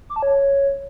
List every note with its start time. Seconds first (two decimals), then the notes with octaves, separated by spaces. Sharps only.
0.10 D6
0.16 A5
0.23 C#5